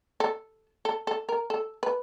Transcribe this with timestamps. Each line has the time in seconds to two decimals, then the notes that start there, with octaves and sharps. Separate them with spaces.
0.20 A4
0.85 A4
1.07 A4
1.29 A#4
1.50 A4
1.83 B4